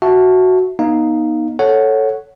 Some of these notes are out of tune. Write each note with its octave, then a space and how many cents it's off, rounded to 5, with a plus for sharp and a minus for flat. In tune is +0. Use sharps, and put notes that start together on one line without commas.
F#4 +0 E5 +0 A5 +0
B3 -35 D#4 +0 F5 +0
A4 +0 C#5 +0 F#5 +0